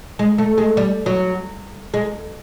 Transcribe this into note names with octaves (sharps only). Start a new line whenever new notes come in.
G#3
A3
G#3
G3
F#3
G#3